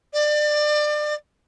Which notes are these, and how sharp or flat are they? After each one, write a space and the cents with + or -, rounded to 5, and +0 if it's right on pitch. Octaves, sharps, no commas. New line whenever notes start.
D5 +30